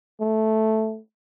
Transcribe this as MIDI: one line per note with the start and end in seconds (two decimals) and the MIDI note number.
0.21 0.99 57